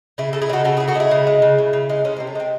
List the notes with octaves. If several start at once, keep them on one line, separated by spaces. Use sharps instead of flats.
C#3 E4 G#4
G#3 A4
E4 G#4
C#3 F#4 A4
C#3 F#4 A4
C#3 E4 G#4
F#4 A4
G#3 E4 G#4
C#3
G#3
C#3
C#3
C#3
G#3
G#3 A3 C#4
C3 C4
A3
G#3 C4